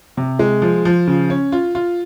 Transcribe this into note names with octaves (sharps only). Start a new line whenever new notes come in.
C3
G#3
F3
F3
C#3
C#4
F4
F4